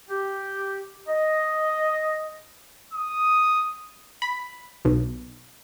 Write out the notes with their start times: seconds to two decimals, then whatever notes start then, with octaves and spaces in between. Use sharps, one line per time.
0.10 G4
1.08 D#5
2.93 D#6
4.22 B5
4.85 B1